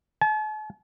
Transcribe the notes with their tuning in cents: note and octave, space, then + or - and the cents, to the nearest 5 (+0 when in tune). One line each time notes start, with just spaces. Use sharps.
A5 -45